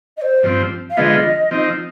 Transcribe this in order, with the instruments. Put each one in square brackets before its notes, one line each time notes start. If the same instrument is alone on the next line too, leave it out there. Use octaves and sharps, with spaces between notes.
[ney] D#5
C5
[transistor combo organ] G2 F3 C4
[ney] F5
[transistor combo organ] D3 F3 G#3 B3 F4 [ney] D#5
[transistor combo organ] F3 C4 D#4